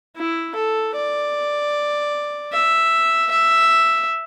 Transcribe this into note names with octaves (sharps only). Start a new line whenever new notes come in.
E4
A4
D5
E5
E5